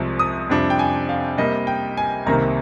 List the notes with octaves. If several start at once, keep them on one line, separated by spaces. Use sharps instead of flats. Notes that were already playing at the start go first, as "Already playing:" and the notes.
Already playing: C2 C3 F3 G#3
D#6
F2 C3 G3 D4 F4
G5
G#5
F5
C3 G3 A#3 D#5
G5
G#5
C2 C3 D#3 A#3 A#5